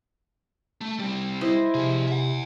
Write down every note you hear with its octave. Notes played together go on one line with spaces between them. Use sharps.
A3
G3 C4
E4 C5 D#5
C3 F3 G#4
E5 F#5